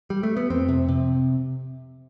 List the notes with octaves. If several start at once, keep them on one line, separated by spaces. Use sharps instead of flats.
G3
A3
B3
F2 C4
C3
C3